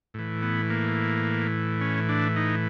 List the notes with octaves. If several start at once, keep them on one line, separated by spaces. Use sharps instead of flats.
A2 E3
B3
A#3
C#4
D4
D#4